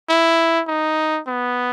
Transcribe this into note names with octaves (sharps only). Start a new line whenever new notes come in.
E4
D#4
B3